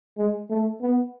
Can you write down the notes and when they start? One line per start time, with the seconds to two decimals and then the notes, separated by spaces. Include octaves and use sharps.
0.18 G#3
0.50 A3
0.81 B3